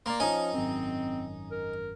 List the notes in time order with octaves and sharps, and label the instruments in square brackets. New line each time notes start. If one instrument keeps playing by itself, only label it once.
[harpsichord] A#3 [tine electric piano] D5 A#5 C6
[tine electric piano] F3 C#4 [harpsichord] D#4 G#5
[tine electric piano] G#1 F#2 [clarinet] C4
[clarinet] A#4